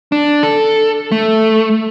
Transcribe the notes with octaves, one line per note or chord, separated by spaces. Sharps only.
D4
A4
A3